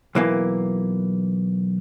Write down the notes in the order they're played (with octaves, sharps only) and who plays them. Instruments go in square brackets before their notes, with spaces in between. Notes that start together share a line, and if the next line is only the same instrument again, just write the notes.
[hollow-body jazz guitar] B1 E3 A#3